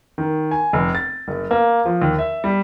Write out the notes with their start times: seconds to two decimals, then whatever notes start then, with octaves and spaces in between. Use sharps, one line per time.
0.18 D#3
0.51 G#5
0.73 F1
0.95 A6
1.28 F#1
1.51 A#3
1.86 F3
2.02 D#2
2.19 E5
2.44 G3